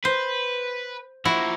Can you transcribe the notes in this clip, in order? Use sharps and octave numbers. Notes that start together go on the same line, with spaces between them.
B4 C5
F3 A#3 E4 F#4